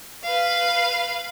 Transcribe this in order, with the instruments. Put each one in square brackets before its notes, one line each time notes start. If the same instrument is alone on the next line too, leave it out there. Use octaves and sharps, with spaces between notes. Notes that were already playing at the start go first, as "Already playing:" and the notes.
[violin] B4 F5